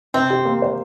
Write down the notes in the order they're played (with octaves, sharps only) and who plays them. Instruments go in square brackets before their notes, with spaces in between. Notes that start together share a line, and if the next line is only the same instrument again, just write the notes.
[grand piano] C3 [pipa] C4
[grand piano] G4
A#3
C5